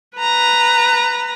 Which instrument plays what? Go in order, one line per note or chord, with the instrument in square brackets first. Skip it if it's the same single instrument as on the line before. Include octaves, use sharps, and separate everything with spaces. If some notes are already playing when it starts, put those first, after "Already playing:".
[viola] B4 A#5